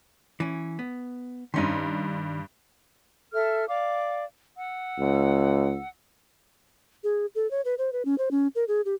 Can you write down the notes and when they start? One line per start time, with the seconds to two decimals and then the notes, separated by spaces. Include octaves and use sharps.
0.40 E3 C#4
0.79 B3
1.54 G2 D#3 C#4 D#4 C6
3.33 A4 E5 F6
3.68 D5 F5 D6
4.56 F#5 E6
4.99 C#2
7.04 G#4
7.35 A4
7.51 C#5
7.65 B4
7.78 C5
7.93 B4
8.05 C#4
8.18 C5
8.31 C#4
8.55 A#4
8.68 G#4
8.85 G4